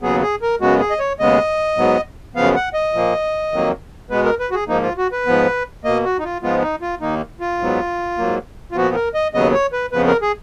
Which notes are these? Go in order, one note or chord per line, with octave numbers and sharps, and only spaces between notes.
D#2 C#3 F#3 B3 G#4
G#4
A#4
F#2 C#3 G#3 B3 F#4
G#4
D#5
C#5
D#2 C#3 G#3 B3 D#5
G#2 F#3 B3
F#2 C#3 F3 B3 F5
F#5
D#5
A#2 F3 A#3
F2 D#3 F#3 A#3
B2 G#3 B3 B4
A#4
B4
F#4
G#4
G#2 F3 A#3 D#4
F4
F#4
B4
G#2 F3 B3
B2 A#3 D#5
F#4
D#4
F4
G#2 F3 G#3 B3 F4
D#4
F4
D#2 D#3 A#3 D#4
F4
G#2 F#3 B3
G#2 F#3 A#3
F4
A#2 F3 B3 F#4
A#4
D#5
D#2 C#3 F#3 B3 D#5
C#5
B4
F2 C#3 F3 B3 B4
A#4
G#4